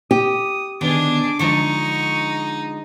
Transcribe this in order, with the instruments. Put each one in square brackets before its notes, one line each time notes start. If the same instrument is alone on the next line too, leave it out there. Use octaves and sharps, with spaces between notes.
[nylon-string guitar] G4 [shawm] D#6
[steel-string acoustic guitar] B2 D3 D#3 [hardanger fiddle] D4 G#4 [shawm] D6
[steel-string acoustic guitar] D3 F3 G#3 [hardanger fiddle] D#4 [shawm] C#6